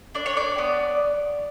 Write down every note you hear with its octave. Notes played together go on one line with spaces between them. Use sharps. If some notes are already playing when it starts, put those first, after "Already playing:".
D4 D5
C#5
D5
B3